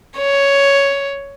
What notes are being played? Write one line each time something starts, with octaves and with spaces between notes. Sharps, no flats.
C#5